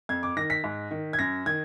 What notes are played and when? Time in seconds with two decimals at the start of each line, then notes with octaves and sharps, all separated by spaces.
0.09 F2 G#6
0.23 D6
0.37 D#3 A#6
0.50 B6
0.64 G#2
0.91 D#3
1.13 G#6
1.19 F#2 A#6
1.46 D#3 G#6